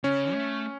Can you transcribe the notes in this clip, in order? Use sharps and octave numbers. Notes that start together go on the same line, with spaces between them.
C#3 C#4
A3